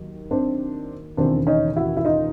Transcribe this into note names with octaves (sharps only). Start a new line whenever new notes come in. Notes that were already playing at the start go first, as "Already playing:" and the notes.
Already playing: D#2 D#3 F#3
C4 D4
E1 D#2 C#3 E3 C4 D4
C#4 D#4
E4 F#4
E4
D#4 F4